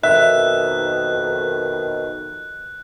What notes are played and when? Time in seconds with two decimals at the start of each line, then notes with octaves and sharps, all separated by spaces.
0.03 F2 B2 D#3 E5 F#6